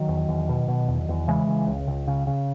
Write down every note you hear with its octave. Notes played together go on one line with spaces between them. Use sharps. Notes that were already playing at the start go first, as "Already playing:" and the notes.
Already playing: D#3 F#3
E2
E2
B2
B2
E2
E2
C#3 E3 G#3
C#3
C#2
C#2
C#3
C#3